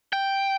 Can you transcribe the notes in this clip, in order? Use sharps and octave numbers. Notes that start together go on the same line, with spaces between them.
G5